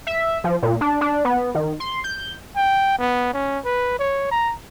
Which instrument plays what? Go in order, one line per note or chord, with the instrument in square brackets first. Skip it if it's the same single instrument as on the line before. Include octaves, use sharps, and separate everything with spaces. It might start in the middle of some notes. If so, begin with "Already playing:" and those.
[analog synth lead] E5
F3
A#2
D4
D4
B3
D#3
C6
G6
[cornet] G5
B3
C#4
B4
C#5
A#5